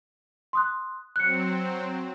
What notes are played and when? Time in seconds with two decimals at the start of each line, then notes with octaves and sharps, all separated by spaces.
0.53 C6 D#6 F#6
1.16 F#3 C4 F#6 C#7